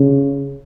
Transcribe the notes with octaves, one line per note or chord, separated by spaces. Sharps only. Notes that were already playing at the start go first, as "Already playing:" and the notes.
Already playing: C#3